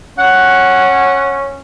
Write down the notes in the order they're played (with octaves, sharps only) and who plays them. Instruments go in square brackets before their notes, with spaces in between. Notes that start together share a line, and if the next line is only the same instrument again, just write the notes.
[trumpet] C#4 [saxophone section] F#5